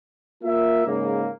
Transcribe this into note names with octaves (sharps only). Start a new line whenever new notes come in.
A#3 F4 A#4 E5
G#2 C#3 A#3